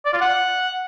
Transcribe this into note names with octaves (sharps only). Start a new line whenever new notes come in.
D5
F4
F#5